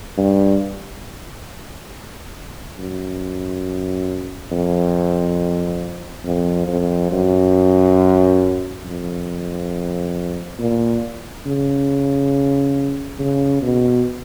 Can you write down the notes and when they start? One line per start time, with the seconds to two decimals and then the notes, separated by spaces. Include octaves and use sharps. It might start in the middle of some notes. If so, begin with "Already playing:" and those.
0.18 G2
2.78 F#2
4.51 F2
6.25 F2
6.68 F2
7.12 F#2
8.85 F2
10.59 A#2
11.46 C#3
13.19 C#3
13.63 B2